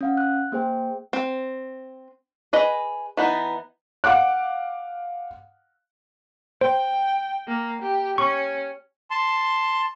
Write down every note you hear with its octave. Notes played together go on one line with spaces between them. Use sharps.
C#4 F5 F#5
F#6
A#3 G#4 C5 G5
C4
G#4 B4 D#5
E3 B3 D#4
F5 F#5 D6 F#6
C5 G5
A#3
G4
C#4 C#6
A5 C6